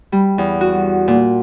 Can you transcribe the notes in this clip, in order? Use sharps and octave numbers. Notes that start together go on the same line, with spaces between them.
G3
E2
F#4
A#2